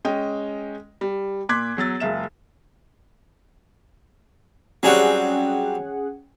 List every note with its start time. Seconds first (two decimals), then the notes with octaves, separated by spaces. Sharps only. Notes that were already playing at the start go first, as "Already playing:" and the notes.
0.05 G#3 C#4 D#5 G5
1.01 G3
1.49 A#2 C6 D6 F#6 G#6 B6
1.77 E2 F#3 E6 A6
2.00 F#1 C#2 E5 E7
4.83 F#3 G3 C4 C#4 G#4 F#5